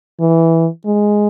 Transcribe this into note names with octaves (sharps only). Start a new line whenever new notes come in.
E3
G#3